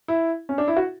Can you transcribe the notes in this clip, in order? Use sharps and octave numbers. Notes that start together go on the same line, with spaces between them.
E4
C#4
D4
E4
F#4